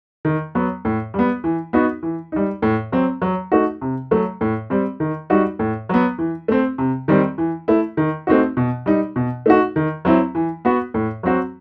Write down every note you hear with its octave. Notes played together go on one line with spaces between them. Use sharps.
D#3
F#3 B3
A2
G3 B3
E3
B3 D#4 F#4
E3
G3 D#4
A2
F#3 C4
F#3
A3 D#4 F#4
C3
F#3 A3
A2
G3 C4
D#3
G3 D#4 F#4
A2
F#3 B3
E3
A3 C4
C3
D#3 G3 C4
E3
A3 E4
D#3
A3 C4 D#4 F#4
B2
G3 D#4
B2
A3 D#4 F#4
D#3
F#3 C4 E4
E3
B3 F#4
A2
F#3 C4 F#4